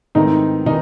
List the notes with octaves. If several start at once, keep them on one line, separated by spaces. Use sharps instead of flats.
G#2 D#3 E3 A3 C4 D#4
D#3 E3 D#4